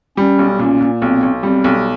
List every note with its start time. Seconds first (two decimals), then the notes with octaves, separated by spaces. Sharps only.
0.17 G3 C#4
0.39 B1
0.59 A#2 C#4
0.81 A#2
1.02 B1 C4
1.23 B1
1.43 G3 C4
1.64 B1